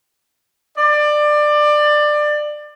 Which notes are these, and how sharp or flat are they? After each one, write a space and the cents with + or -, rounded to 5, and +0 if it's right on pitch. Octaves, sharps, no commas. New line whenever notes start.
D5 +20